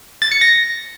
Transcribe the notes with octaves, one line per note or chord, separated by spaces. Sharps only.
A6
C#7
A#6